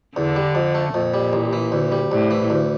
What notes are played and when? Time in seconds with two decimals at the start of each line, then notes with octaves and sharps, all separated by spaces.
0.16 E2 D3
0.36 G3
0.55 F2
0.75 A3
0.94 F2 A#2
1.14 G3
1.33 A1
1.53 E3
1.72 D2
1.92 G3
2.11 C2 A2
2.31 E3
2.50 D2